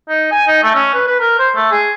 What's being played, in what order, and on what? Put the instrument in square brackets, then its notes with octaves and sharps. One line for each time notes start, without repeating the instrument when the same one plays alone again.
[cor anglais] D#4
G#5
D#4
A3
C#4
B4
B4
A#4
C5
A3
G#4